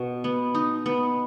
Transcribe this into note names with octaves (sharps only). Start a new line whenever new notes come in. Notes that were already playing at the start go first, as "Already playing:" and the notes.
Already playing: B2 F#4
B3
D#4
B3